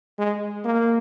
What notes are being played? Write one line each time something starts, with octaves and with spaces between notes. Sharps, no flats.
G#3
A#3